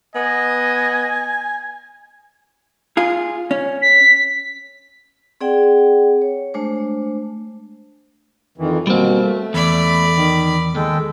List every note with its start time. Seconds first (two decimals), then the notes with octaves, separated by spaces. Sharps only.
0.15 B3 D#5 G#5
2.97 F4 G#4
3.51 C#4
3.81 B6
5.41 C4 G#4 D5 F#5 G5
6.22 C#5
6.54 G#3 A3 D4 C5
8.58 F2 D#3 E3
8.87 B2 G3 A#3 C4
9.21 A3
9.54 E2 D5 B5
10.15 D#3
10.75 D#2 G#3 A4 G5